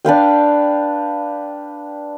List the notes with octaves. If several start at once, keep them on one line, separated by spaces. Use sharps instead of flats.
D4 B4 F5 G5